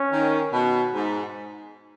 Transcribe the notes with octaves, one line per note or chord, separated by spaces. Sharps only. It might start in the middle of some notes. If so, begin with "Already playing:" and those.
Already playing: C#4
D#3
B2
G#2